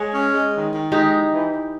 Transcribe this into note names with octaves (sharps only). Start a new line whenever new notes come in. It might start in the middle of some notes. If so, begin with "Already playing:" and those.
Already playing: G#3 C#5
C#4
G#3
D#3
D#3
G#3 D#4 G4
E3
E3
E3